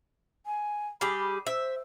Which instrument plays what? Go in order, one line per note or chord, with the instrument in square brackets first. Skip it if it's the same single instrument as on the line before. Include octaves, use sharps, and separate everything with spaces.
[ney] G#5
[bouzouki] G3 G4 G#4 [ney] B5
[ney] C5 [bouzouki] E5